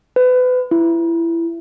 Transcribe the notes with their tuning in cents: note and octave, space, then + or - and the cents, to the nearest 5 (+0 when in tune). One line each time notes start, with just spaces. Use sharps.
B4 +30
E4 +20